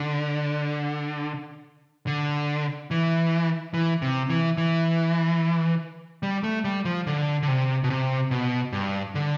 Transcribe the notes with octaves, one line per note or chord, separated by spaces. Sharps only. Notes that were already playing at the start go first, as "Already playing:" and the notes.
Already playing: D3
D3
E3
E3
C3
E3
E3
G3
A3
G3
F3
D3
D3
C3
B2
C3
B2
G2
D3